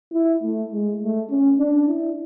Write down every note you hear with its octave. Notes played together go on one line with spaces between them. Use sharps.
E4
A3
G#3
A3
C#4
D4
E4